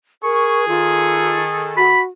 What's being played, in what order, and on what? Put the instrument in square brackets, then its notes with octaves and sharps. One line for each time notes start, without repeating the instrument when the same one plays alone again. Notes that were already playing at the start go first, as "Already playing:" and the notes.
[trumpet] G#4 [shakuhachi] A#4 [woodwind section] C#6
[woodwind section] D#3 A4 [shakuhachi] F4
[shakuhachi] F#4 [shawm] B5